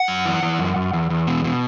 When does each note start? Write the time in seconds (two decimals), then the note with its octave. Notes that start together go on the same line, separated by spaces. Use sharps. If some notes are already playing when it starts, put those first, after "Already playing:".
Already playing: F#5
0.08 F#2
0.25 E3
0.43 E3
0.59 F#2
0.76 F#2
0.93 E2
1.10 E2
1.27 B2
1.44 B2